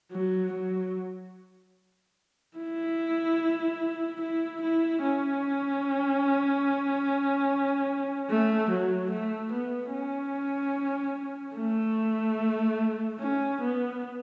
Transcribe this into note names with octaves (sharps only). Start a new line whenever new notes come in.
F#3
F#3
E4
E4
E4
C#4
A3
F#3
A3
B3
C#4
A3
C#4
B3